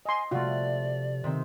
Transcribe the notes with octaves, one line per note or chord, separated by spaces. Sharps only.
D#5 G#5 C6
C3 F3 A3 F4 F#4 D5
C3 D#3 C4